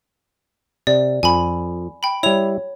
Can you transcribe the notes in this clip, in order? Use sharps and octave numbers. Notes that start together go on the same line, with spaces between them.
C3 D5
F2 G#5 B5
G5 B5
G3 E4 C#5 F7